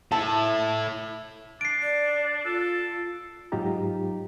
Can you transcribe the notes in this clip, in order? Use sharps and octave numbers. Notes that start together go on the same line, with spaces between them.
E4 A4 A5
D4 C7 D7
D5
F4 A4
G#2 F#3 D#4 F4 G4 A#5